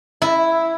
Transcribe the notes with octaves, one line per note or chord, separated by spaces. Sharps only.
E4